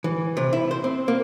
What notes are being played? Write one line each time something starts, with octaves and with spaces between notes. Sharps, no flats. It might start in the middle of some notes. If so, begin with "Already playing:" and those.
E3
C3
E4
C5
C4
A#3